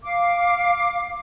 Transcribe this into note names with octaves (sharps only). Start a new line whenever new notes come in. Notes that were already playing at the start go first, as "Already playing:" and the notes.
F5 D6